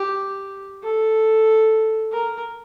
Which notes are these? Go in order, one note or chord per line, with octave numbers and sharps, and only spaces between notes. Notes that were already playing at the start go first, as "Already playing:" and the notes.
Already playing: G4
A4
A#4